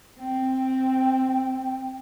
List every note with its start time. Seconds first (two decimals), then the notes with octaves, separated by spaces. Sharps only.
0.19 C4 G5